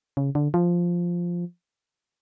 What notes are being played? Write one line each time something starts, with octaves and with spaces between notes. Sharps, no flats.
C#3
D3
F3